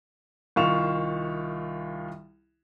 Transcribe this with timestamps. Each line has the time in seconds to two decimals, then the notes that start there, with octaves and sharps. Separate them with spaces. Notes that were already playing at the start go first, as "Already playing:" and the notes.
0.56 C2 D#3 F4 C#6 E7 F7